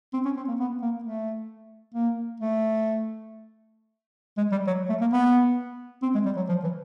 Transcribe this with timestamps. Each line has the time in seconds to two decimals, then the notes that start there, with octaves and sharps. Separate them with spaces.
0.13 C4
0.25 C#4
0.37 C4
0.48 A#3
0.59 B3
0.82 A#3
1.03 A3
1.94 A#3
2.40 A3
4.37 G#3
4.51 G3
4.67 F#3
4.89 A3
5.01 A#3
5.12 B3
6.02 C4
6.14 G#3
6.25 G3
6.36 F#3
6.48 F3
6.63 E3